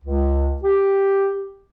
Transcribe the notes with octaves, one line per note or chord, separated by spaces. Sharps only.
C#2
G4